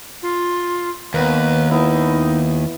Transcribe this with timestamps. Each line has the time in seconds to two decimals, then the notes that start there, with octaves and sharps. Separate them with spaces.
0.22 F4
1.14 D#2 A#3 B3 B4
1.71 B3 D#4 E4